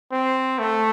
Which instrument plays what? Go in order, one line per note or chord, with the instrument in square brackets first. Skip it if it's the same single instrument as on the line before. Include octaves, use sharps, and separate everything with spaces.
[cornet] C4
A3